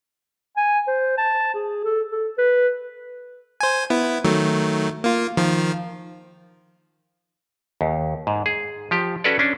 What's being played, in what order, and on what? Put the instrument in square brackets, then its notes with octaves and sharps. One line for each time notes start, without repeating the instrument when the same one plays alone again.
[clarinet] G#5
C5
A5
G#4
A4
A4
B4
[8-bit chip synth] C5 G#5
B3 E4
D#3 F#3 A3
A#3 F4
D#3 F3 F4
[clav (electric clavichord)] D#2
G#2
G#4
F3 G4
C#4 F#4 A4 B4 C#5 D5
C#4 D4